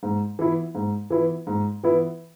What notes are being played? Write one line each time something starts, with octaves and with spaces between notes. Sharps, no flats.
G#2
E3 B3 E4
G#2
E3 B3 E4
G#2
E3 B3 E4